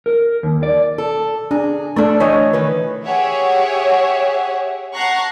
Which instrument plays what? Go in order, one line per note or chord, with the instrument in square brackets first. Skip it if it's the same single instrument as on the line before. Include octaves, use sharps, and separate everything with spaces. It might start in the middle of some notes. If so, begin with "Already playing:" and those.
[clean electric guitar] A#4
D#2
D5
[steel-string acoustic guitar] A4
[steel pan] D4 [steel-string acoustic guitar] G#4
[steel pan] A3 A4 [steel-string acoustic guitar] D4 E4 D5
[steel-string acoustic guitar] E3 [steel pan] C#5 D#5 G#5
[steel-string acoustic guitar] D#3 E3 B4
[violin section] G4 G#4 C#5 E5 F#5
F#5 A5 A#5 C#6 F#6 C7